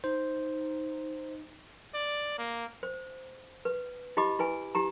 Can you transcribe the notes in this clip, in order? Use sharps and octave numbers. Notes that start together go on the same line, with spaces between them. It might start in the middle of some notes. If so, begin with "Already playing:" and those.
D#4 C5
D5
A#3
C5
B4
E4 G4 D#5 B5 D6
E4 B4 G#5
E4 G4 A#5